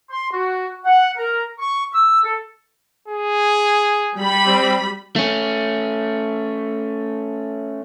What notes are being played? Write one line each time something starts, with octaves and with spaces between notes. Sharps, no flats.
C6
F#4
F#5
A#4
C#6
E6
A4
G#4
G3 B5
C4
A3 C#4